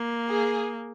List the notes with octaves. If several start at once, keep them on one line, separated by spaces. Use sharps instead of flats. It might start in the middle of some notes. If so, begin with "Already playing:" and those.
Already playing: A#3
G#4